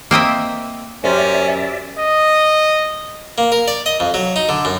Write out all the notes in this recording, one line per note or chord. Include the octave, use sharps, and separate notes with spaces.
A#3 C4 D#5 E5
F#2 C#4 G4 A#4 C5 D5 E5
D#5
A#3
A#4
D5
D#5
F2
F#3
D#4
D3
F#2